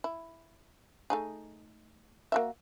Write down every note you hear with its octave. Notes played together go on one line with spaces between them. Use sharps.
E4
A3 D#4 G#4
A#3 F#4 E5